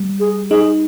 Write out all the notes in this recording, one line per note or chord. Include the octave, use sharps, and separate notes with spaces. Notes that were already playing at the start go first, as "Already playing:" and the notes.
Already playing: G3
G#4
D#4 G#4